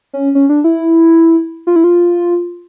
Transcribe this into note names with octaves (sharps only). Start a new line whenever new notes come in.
C#4
C#4
D4
E4
F4
E4
F4